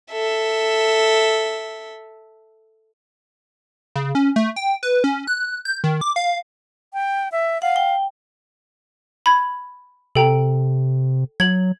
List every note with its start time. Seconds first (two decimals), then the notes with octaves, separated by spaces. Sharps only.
0.12 A4 E5
3.95 C#3
4.15 C#4
4.36 A3
4.56 G5
4.83 B4
5.04 C#4
5.27 F#6
5.65 G6
5.84 D#3
6.01 D6
6.16 F5
6.94 G5
7.32 E5
7.62 F5 F#5
7.76 G5
9.26 B5 G#6
10.15 C3 A4 G5 A#5
11.40 F#3 G#6 F#7